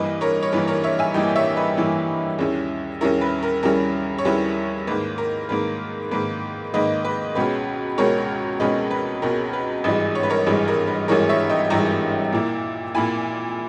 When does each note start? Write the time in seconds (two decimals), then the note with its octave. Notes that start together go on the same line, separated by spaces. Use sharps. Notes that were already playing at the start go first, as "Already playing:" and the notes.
Already playing: G2 E3 A#3 B4 D#5
0.21 A#4 C#5
0.43 C#5
0.53 G2 E3 A#3 B4
0.68 A#4 C#5
0.84 C#5 E5
0.99 E5 G#5
1.14 G2 E3 A#3 D#5 G5
1.36 C#5 E5
1.56 B4 D#5
1.77 G2 E3 A#3
2.39 D#2 C#3 G3 C#4 E4
3.01 D#2 C#3 G3 C#4 E4 A#4
3.21 B4
3.43 A#4
3.63 D#2 C#3 G3 C#4 E4 A#4
4.18 C#5
4.25 D#2 C#3 G3 C#4 E4 B4
4.87 G#2 D#3 A#3 B4
5.18 A#4
5.49 G#2 D#3 A#3 B4
6.11 G#2 D#3 A#3 B4
6.74 G#2 D#3 A#3 B4 D#5
7.05 B4
7.35 C#2 B2 G#3 C#4 B4
7.98 C#2 B2 G#3 C#4 A#4 C#5
8.60 C#2 B2 G#3 C#4 B4 D#5
8.91 B4
9.22 C#2 B2 G#3 C#4 A#4
9.53 B4
9.84 G#1 G2 E3 G#3 B4 D#5
10.15 C#5
10.23 B4
10.30 A#4 C#5
10.46 G#1 G2 E3 G#3 B4
10.68 A#4
10.87 B4
11.08 G#1 G2 E3 G#3 A#4 C#5
11.29 C#5 E5
11.50 D#5 G5
11.70 G#1 G2 E3 G#3 G5 A#5
12.33 A#2 A#3 E4
12.94 A#2 A#3 E4 G#5 B5